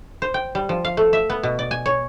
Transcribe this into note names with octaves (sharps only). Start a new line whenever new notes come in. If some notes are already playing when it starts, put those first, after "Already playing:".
C5
G5
G3
F3
F5
A3
E5
B3
B2
D5
G#5
C#5